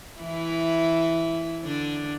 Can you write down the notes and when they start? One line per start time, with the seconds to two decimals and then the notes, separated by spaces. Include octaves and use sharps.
0.21 E3 E4
1.64 D3 D4